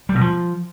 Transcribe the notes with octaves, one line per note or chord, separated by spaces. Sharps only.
G3
B2
F3